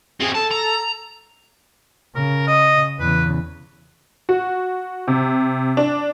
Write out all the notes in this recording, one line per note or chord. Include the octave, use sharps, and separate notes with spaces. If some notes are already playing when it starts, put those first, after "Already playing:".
F#2 C4 G#4
A4 A5
A#5
C#3 A#4
D#5
E2 C#3 B4
F#4
C3
D4